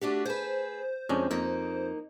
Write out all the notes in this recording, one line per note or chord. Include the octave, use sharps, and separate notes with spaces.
A3 D4 F#4 G4
G#4 B4 C5
F2 G#3 C#4 D4
F2 A#3 D#4